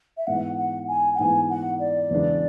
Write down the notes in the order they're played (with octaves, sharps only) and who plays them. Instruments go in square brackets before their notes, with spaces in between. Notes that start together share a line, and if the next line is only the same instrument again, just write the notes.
[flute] E5
[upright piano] G#2 E3 G#3 B3 [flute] F#5
[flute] F#5
G#5
F#5
[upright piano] G#2 E3 G#3 B3 [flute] G#5
[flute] F#5
D5
[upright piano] E2 C#3 G#3 D4